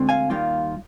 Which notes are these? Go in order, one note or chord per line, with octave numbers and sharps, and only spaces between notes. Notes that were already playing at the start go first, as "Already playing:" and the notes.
Already playing: D2 D3 G#3 C4
F5 G#5
D#2 D#3 G3 A#3 F4